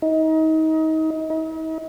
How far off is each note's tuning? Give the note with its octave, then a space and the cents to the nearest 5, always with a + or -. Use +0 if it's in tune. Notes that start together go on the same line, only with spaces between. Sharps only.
D#4 +30
D#4 +45